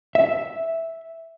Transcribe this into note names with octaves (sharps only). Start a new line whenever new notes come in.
E5